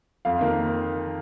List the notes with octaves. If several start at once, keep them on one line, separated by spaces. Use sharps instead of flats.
F2 F5
D#3 A#3